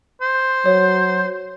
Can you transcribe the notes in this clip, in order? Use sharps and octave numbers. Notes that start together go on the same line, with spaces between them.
C5
F#3 C#5